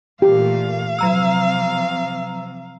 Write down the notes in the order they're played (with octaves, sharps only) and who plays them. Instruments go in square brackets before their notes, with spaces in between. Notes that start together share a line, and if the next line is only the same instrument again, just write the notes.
[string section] A#2 E3 A3 [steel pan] G4 [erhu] F5
[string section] C3 F3 [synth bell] F#3 A#5 E6